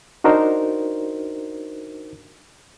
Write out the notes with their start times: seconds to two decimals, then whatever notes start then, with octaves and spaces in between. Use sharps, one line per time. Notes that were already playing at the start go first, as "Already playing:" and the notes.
0.24 D4 D#4 F#4 A#4 C5